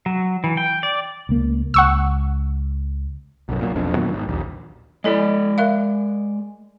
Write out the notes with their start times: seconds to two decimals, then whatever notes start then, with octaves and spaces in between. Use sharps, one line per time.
0.06 F#3
0.44 E3
0.57 G5
0.83 D5
1.29 C#2 A#3
1.74 C#2 F#5 C#6 E6
3.49 B1 F#2
3.61 A#2 D#3 F#3
3.75 E1 B1 F2 D4
3.95 A#2 D#3 F#3 B3
4.13 G#1
4.28 A#1 D#2
5.04 G#3 E4 A4 D5 D#5
5.58 A#4 E5 F5